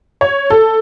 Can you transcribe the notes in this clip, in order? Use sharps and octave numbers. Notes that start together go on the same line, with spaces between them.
C#5
A4